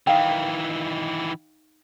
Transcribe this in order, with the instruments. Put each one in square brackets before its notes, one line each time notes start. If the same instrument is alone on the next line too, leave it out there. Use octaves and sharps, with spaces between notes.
[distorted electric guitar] D#3 E3 [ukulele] D#4 F5 G5